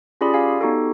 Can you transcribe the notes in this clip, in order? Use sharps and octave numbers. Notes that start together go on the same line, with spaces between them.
C#4 F4 G4 G#4 D5 B5
G4 D5 F5 G#5
B3 D#4 F#4 G4 A4